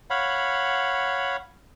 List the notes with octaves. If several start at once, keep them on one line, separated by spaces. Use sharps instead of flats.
C#5 F5 F#5 B5